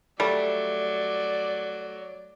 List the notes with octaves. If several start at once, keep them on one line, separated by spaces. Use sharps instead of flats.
F#3 G3 A3 D5